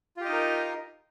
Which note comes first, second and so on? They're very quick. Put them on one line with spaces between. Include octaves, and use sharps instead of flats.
F4 G4 D#5 D#4 A#4